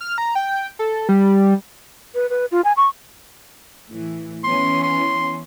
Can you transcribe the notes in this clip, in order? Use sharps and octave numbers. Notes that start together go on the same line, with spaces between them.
F6
A#5
G5
A4
G3
B4
B4
F4
G#5
C#6
A2 E3
E3 B3 C#4 C6
C6